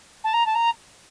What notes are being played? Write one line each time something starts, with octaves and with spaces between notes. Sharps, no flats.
A5
A#5
A5
A#5